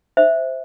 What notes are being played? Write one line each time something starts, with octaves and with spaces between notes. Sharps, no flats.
C5 E5